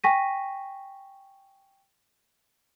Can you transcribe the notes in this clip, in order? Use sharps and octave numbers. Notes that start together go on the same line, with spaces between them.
G5 G#5 C#6 A#6 B6 D#7